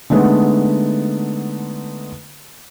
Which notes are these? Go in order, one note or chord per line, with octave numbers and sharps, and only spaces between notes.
D3 G#3 A3 B3 D#4